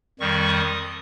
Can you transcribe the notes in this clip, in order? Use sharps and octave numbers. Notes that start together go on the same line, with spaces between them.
F2 D#3 G3 C#6
D#6